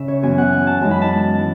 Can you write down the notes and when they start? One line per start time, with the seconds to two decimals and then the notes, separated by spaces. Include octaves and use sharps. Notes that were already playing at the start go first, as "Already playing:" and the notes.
Already playing: C#3 C#4 E5
0.08 C#5
0.23 F#2 E3 B3 G#5
0.38 F#5
0.52 G#5
0.67 A5
0.81 F#2 E3 G#3 D#4 A5
0.91 B5
1.02 A5
1.39 E3